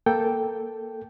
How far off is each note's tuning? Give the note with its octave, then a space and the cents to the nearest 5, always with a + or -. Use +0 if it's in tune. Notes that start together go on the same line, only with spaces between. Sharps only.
A#3 +0 A4 +0 G5 +0